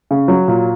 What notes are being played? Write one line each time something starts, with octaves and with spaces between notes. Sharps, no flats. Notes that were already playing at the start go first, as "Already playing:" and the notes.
C#3
F#3
A#2